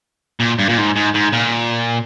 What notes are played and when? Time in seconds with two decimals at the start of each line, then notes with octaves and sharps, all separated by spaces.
0.40 A#2
0.59 G2
0.69 A#2
0.78 G#2
0.96 G#2
1.14 G#2
1.32 A#2